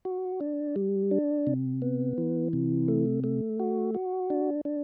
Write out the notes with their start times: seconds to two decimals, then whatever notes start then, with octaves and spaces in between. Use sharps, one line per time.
0.05 F#4
0.41 D4
0.76 G3
1.11 D4
1.47 C3
1.82 B3
2.18 E3
2.53 C3
2.88 A3
3.24 A3
3.59 F#4
3.95 F#4
4.30 D4
4.65 D4